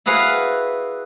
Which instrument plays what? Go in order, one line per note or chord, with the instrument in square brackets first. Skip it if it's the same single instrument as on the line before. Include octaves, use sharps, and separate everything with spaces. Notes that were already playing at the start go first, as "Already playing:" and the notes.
[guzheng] E4 F#4 G#4 B4 F5